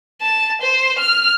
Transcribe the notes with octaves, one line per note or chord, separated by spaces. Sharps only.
A5
C5
F6